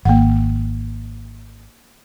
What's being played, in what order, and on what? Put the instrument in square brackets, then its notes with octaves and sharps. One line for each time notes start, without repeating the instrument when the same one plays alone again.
[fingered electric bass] G#1 [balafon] A#3 F#5